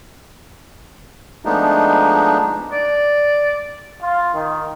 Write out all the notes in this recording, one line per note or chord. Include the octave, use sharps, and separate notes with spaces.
F3 G#3 A3 B3 D4 D#4
D5
F4
D#3